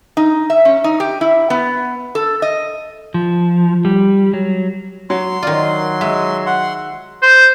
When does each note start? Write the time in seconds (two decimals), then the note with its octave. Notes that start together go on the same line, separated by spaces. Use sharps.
0.17 D#4
0.50 E5
0.65 C#4
0.84 D#4
1.00 G4
1.21 E4
1.50 B3
2.15 A4
2.42 D#5
3.14 F3
3.85 G3
4.34 F#3
5.10 F#3 C6
5.43 D#3 F#3 F4 D5
6.01 G#3 E5
6.46 F#5 C6
7.22 C5